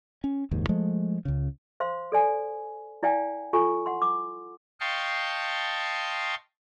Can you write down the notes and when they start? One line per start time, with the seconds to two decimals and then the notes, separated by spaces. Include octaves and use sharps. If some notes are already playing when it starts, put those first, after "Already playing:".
0.24 C#4
0.51 F#1 D#2 G#2
0.69 F3 G#3 A3
1.25 C#2 C#3
1.80 C5 F5 C6
2.12 A4 D5 G#5
3.03 E4 D5 F5 G5 G#5
3.53 F4 A4 G#5 C#6
3.86 F#5 C6
4.02 D6
4.80 D#5 F5 G5 A5 C6 C#6